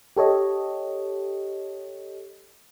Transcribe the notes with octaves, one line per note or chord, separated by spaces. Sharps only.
G4 A4 C#5 D#5